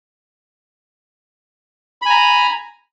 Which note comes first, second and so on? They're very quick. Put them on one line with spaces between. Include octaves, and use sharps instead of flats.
B5 G#5 A#5